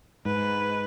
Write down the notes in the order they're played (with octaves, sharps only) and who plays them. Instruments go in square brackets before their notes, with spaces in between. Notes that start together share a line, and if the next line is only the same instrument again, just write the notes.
[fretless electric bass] G#2 [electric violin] B4